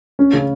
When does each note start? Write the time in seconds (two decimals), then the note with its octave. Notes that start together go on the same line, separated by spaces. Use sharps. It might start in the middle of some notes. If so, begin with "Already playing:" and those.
0.19 C#4
0.33 C#3